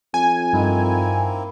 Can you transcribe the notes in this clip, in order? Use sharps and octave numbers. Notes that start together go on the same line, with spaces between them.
F2 G#5
G2 A#3 C4 D#4 E4